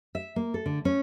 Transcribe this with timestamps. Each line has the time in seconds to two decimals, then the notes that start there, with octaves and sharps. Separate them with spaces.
0.15 E5
0.36 A#3
0.54 A4
0.66 D3
0.85 C#4